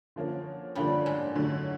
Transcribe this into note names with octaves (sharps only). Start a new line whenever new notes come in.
D3 F3 A#3 C#4
G2 D3 F3 G3 A#3 C#4
G#2 G#3
D3 F#3 A3 C#4